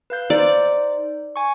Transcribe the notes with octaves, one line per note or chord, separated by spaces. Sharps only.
B4 F5 G6
D#4 C5 D5
G#5 C#6